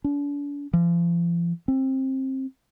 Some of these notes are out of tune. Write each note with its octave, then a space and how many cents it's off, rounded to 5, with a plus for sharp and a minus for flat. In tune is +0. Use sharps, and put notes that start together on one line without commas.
D4 -40
F3 -40
C4 +20